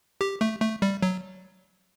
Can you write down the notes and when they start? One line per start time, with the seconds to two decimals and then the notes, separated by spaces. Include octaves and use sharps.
0.21 G4
0.41 A3
0.61 A3
0.82 G3
1.02 F#3